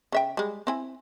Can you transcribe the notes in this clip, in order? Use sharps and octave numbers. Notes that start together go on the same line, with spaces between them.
C#3 E5 G5
G3 G#3
C4 E4 G#5